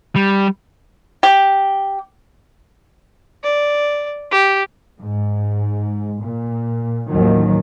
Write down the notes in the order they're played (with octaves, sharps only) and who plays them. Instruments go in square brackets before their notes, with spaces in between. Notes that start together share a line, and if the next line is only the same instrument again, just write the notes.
[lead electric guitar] G3
[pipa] G4
[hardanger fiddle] D5
G4
[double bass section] G#2
A#2
A1 D#2 D#3 F3 F#3